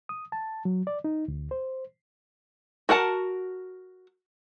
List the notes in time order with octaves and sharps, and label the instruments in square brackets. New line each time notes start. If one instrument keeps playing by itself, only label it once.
[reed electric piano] D#6
A5
F#3
D5
D#4
D2
C5
[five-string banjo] F#4 A#4 F#5 A5